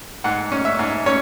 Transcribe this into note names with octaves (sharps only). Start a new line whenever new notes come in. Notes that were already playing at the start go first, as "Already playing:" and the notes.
G#2 F#5
C#4
E5
G#2
C#4 C#5